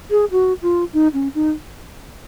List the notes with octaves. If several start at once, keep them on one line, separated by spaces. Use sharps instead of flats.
G#4
F#4
F4
D#4
C#4
D#4